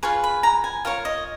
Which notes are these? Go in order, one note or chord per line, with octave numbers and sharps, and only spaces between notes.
F4 G#4 B4 C#6
B5
A#5
G#5
F4 A#4 C#5 F5
D#5